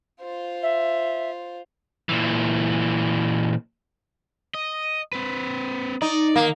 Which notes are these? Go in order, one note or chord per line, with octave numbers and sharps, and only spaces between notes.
F4 C5
E5
A#2 E3
D#5
C4 B4
D#4 D5
D#3 A#3 A#4